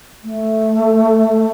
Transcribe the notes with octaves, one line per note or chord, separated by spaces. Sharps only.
A3